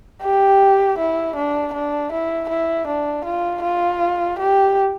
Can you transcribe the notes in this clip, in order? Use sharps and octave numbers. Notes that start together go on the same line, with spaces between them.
G4
E4
D4
D4
E4
E4
D4
F4
F4
G4